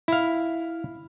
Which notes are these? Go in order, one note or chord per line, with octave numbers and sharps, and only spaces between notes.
E4 F5